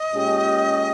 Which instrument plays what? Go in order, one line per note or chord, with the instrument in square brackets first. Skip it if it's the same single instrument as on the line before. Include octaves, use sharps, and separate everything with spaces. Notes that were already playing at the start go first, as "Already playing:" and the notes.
Already playing: [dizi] D#5
[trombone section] A#2 G#3 C#4 G4